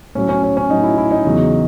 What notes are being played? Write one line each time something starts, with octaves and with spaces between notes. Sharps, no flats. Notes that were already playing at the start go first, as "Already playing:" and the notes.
A2 F#3 C#4
C#4
C#4
C#4
A2 F#3 D#4
E4
E4
D#4
E2 C#3 F#3